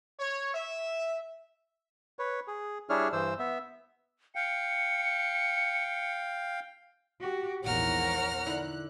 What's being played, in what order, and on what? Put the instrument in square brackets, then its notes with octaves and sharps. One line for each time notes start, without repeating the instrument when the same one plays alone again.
[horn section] C#5
E5
[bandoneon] B4 C#5
G#4
G3 D4 E4 G#4 C#5 F6
G2 E3 C5 E6
B3 E5
[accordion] F5 G5 [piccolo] C#7
[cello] F#4 G4
[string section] A#1 E2 [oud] G#2 F3 [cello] A#4 C#5 [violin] F#5 F6
[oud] D3 D#4 E4 [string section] F#6